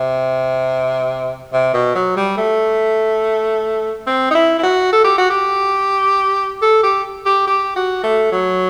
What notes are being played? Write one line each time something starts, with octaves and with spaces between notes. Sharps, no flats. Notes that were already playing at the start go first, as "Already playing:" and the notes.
Already playing: C3
C3
B2
F#3
G3
A3
C4
D#4
E4
E4
F#4
A4
G4
F#4
G4
A4
G4
G4
G4
F#4
A3
F#3